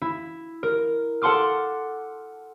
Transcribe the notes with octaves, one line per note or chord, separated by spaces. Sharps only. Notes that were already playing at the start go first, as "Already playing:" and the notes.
E4
A#4
A4 F#5 A5 C6 D6 F6